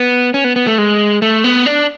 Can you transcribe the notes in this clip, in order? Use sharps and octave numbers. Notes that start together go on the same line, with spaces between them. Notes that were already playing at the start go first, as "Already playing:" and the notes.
Already playing: B3
C#4
B3
B3
A3
G#3
A3
B3
D4